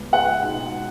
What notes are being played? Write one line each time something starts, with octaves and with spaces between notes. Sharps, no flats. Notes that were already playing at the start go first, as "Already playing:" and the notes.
Already playing: C#2 C#3 G#3 B3
F#5
B2 G#3 D#4